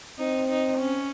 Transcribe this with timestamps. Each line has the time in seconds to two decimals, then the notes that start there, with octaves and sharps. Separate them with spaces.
0.18 C4 D#4
0.48 D#4
0.78 C#4